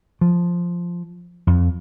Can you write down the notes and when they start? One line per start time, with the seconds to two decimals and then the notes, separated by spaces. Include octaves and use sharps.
0.21 F3
1.47 F2